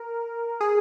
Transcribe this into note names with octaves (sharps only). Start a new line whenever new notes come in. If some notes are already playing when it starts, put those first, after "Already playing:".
Already playing: A#4
G#4